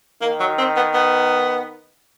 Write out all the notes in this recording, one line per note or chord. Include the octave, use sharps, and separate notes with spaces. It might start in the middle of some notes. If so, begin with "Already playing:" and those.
D#3 A#3
F#3
C4
B3
B3